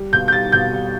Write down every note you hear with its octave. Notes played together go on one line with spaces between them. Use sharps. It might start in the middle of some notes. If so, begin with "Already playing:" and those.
Already playing: G3
B2 G6
G6
G3 A6
B2 G6
G3